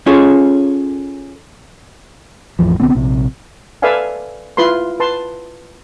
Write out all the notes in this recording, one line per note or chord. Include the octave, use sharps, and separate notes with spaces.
C#4 F4 G#4 A4 C#5
A1 F2 E3 F3
B1 D3 B3 C4
A#1 C3
A4 B4 D5 E5 F5 G#5
E4 F4 B4 B5 C6
B4 A5 C6